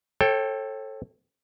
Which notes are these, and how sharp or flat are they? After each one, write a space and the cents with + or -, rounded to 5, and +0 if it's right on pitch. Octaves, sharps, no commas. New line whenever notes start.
A4 +0 C#5 -40 G5 +0